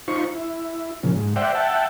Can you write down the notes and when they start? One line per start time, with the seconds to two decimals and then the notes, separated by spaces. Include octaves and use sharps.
0.08 D#4 F4 C5 C#6
0.35 E4
1.03 A#2 C#3 F3
1.16 G#2
1.36 C5 D5 E5 F#5 G5
1.55 E5 F#5 G5 A5